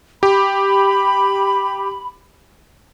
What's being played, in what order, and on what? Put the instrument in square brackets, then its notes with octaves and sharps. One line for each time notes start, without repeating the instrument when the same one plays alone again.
[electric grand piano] G4 [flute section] B5